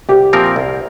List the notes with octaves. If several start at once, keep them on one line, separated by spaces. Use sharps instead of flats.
C2 G4
A#2 F3 C4 A#4
C2